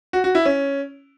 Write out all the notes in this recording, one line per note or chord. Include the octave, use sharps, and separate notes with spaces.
F#4
F#4
E4
C#4